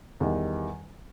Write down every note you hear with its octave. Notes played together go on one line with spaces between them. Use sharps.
E2 D#3 G3